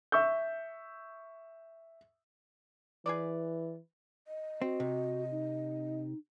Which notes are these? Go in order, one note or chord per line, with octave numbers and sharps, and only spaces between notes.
E5 C#6 E6 G6
E3 G#4 B4 D5
D#5
C4 F#4
C3
D#4